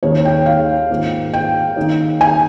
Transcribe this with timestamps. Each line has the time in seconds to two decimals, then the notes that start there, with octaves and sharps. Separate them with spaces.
0.03 D#2 D#3 G#3 C#5
0.25 G5
0.46 F5
0.90 G#2 D#3 A#3 F4
1.33 G5
1.76 D#3 A#3 D#4 G#4 C#5
2.21 G#5